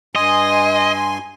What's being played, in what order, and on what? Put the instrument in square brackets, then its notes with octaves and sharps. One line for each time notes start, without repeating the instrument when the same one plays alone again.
[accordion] G2 G#5 C6 [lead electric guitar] D#5